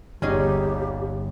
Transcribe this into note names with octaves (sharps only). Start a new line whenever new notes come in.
G1 D#2 G3 C#4 D#4 G4 G#4